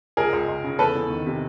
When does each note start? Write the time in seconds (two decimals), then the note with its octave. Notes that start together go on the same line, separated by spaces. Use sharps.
0.17 C#2 G#4 A#4
0.33 C#2
0.48 C#2
0.64 C#3
0.79 E2 A4 B4
0.95 E2
1.10 D#3
1.27 C3